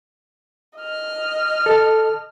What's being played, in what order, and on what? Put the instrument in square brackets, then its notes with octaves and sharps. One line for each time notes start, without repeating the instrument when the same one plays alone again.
[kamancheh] D#5 F6
[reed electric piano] A4 A5